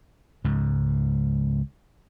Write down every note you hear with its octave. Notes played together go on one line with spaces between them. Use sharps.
C#2 G#2